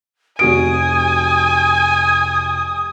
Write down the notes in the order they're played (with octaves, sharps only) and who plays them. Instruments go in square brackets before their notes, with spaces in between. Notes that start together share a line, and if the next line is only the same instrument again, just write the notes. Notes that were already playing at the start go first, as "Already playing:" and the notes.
[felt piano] F1 F#4 D7 [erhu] G#5 [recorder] D#6